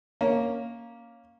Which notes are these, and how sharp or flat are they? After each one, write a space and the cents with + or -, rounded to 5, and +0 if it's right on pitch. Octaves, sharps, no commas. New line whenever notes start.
A#3 +0 C#4 +0